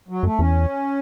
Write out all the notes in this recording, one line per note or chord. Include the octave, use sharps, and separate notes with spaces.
F#3
F#2 A3
E2 C#4